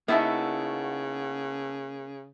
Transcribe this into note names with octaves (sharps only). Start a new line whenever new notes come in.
C#3 A#3 B3 D#4 E4 F#4 A4 E5